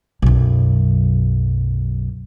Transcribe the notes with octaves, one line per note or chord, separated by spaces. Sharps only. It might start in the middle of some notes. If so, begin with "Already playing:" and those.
B1 F#2